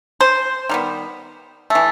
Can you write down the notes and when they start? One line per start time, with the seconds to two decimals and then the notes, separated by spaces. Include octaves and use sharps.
0.21 C5
0.69 D#3 G3 B3
1.70 E3 A3